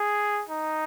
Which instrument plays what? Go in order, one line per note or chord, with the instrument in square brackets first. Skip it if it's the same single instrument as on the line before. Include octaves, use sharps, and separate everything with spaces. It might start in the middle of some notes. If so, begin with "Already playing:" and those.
Already playing: [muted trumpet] G#4
D#4